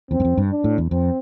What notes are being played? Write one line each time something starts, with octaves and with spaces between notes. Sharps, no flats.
E2 C4
G2
F2
G2
D4
A2
E2
F2 C4